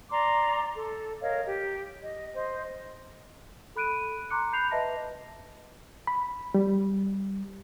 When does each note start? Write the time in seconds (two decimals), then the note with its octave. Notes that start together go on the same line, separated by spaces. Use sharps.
0.10 D5 A#5 C6 D6
0.74 A4
1.21 A#4 C#5 D#5 F5
1.45 G4
2.03 D#5
2.35 C5 D#5
3.76 A4 B5 F#6 D7 D#7
4.30 A#5 C6 D6 F#6 C#7
4.53 B5 G6 C7 F7
4.71 B4 D#5 E5 A5 A#6
6.07 B5
6.54 G3